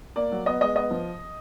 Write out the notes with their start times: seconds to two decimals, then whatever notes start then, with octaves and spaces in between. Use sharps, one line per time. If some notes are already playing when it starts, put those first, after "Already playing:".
0.16 A#3 D5
0.32 F#3
0.46 B3 D#5
0.61 G#3 D#5
0.76 B3 D#5
0.91 F3